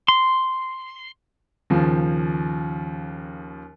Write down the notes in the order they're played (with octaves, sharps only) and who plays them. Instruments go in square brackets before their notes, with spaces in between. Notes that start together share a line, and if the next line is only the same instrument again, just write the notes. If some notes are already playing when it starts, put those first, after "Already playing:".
[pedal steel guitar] C6
[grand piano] D#2 C#3 F3